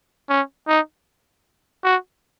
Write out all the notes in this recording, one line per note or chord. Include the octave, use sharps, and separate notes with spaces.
C#4
D#4
F#4